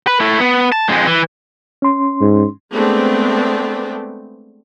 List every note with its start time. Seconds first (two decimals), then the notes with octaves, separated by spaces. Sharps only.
0.07 B4
0.20 A3 E4
0.40 B3
0.72 A5
0.89 F2 G#3
1.07 E3
1.82 C#4 C6
2.21 G#2
2.73 G#3 A3 B3 C4 D4 G#4